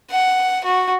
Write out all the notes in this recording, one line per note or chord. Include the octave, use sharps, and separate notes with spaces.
F#5
F#4